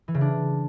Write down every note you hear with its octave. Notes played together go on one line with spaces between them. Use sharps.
E3
C#3
D4